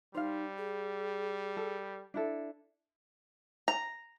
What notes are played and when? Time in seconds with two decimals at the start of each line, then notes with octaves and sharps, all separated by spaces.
0.15 G3 D#4 C5 F5
0.58 G#4
1.57 A4
2.14 D4 E4 A4
3.68 A#5